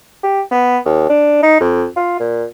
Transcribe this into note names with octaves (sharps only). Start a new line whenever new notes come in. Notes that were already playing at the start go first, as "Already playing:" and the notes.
G4
B3
D#2
D4
D#4
F2
F4
A#2